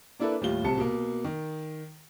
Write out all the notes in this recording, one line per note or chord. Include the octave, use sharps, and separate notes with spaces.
A#3 D4 E4 A4 B4
D#2 A2 G3 F4 G7
D1 C2 C3 A5 C#7
B2 A#3
D#3